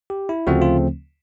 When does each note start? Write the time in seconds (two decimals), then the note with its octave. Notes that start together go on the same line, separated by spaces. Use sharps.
0.10 G4
0.29 E4
0.47 D2 C#3 F3 A3 C4 F#4
0.62 F4